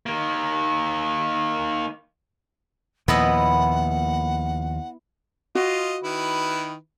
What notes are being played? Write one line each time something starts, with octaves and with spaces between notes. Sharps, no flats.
D#3 A#3
D#2 A#2 F3 B3 E4 D#5 F#5
F4 F#4 D#5
D#3 E4 B4